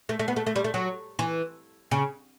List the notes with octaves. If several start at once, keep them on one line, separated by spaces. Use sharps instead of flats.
A3
A3
B3
A3
A3
G3
A3
F#3
E3
C#3